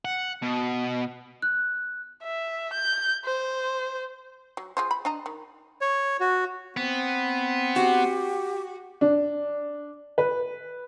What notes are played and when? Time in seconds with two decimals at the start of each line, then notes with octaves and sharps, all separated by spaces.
0.05 F#5
0.43 B2
1.42 F#6
2.23 E5
2.74 G6
3.25 C5
4.57 F#3
4.77 G#3 F4 C5
4.91 B5
5.05 D4 D#5 A#5
5.26 D#3
5.81 C#5
6.20 F#4
6.77 B3 C4
7.76 F#4 G4
9.01 D4
10.18 B4